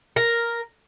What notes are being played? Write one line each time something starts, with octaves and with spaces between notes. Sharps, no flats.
A#4